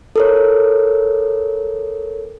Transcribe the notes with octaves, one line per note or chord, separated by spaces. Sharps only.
A4 A#4 C#5